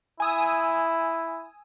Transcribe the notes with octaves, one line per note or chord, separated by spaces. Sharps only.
E4 G#5 D#6 E6